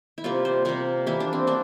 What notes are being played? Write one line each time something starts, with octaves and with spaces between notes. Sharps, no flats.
E4
C3 G3 A#3 F4
C5
C3 G3 A#3 A#4
E3 G3 A#3 E4
D4
C4
A#3 D4